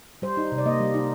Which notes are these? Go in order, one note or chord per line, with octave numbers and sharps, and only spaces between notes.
G3 C5
D#4
C3
D5
A#3 D#5
G3
D#4